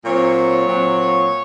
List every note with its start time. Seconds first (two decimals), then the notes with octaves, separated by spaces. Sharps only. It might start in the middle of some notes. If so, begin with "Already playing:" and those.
0.05 A#2 F#3 C4 C#5
0.67 A#2 F#3 C4